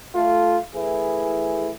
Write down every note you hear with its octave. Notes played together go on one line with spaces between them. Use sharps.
A3 F4
E3 A3 E4 G#4